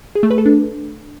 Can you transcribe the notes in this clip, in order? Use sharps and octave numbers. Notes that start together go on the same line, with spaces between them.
G#4
A3
B4
A4
D4